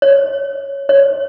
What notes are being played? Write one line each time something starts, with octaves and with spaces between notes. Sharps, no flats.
C#5
C#5